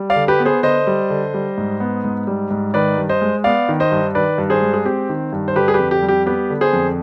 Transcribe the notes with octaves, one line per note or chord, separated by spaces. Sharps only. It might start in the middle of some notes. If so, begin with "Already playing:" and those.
Already playing: G3
D5 F5
D3
G4 B4
B3
G#4 C5
D3 C5 D#5
G3
D3
G3
G#2
B3
G#2
G3
G#2
D#3 B4 D5
G2
C5 D#5
G#3
B3 D5 F5
D#3
C5 D#5
G2
D#3 B4 D5
G2
G#4 C5
G#3
G#4
C4 G4
D#3
G2
C5
D3 G4 B4
G#4
G4 B4
F2
G4
G3
G4
B3 G4 B4
D3
G#4 C5
F2